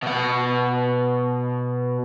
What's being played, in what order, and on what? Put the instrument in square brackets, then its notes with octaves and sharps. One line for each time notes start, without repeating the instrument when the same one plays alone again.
[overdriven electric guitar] B2 F#5